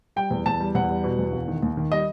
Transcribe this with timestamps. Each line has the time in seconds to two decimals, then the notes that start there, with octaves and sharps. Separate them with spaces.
0.16 G3 G5
0.31 E2
0.46 E2 A5
0.60 G3
0.75 E2 F#5
0.89 G3
1.04 B2
1.19 E2
1.33 E1
1.48 D#3
1.62 D#2
1.77 D#3
1.92 G3 D#5